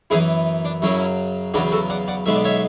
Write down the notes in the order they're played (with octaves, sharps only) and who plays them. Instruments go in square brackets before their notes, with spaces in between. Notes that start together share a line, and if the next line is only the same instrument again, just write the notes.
[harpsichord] F#2 E3 B3 E4 G#4
D4
F#2 C#3 F#3 C#4 E4
E2 C#3 F#3 B3 D4 F#4
F#4 A4
D5 F#5
D5 F#5
B1 B2 G#3 B3 E5
D5
C#5 E5